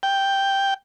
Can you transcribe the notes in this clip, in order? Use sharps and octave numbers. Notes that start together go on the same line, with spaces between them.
G5